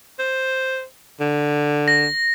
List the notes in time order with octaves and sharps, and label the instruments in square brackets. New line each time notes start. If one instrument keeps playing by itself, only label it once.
[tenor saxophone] C5
D3
[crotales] A#6